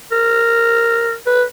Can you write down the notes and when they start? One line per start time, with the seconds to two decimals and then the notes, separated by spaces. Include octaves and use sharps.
0.12 A#4
1.26 B4